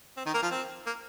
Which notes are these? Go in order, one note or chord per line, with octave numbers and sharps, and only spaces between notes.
C4
D#3 D#4
A#3 A#4
F3 F4
C4
A#3